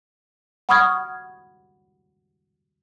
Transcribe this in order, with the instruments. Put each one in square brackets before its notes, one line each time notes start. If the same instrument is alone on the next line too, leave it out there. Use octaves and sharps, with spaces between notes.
[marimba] F#5 B5 C#6 D#6 F6 G#6